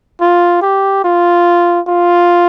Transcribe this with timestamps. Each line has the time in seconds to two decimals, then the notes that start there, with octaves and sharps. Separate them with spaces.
0.21 F4
0.62 G4
1.04 F4
1.88 F4